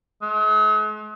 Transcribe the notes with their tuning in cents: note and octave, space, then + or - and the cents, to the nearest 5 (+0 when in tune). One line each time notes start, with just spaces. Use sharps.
G#3 +45